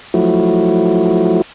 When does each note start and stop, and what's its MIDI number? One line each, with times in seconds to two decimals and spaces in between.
0.14 1.42 53
0.14 1.42 54
0.14 1.42 57
0.14 1.42 64
0.14 1.42 66